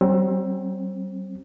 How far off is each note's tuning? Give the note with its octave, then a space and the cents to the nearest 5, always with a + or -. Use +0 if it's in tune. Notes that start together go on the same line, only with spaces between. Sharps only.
G3 -45 C4 +30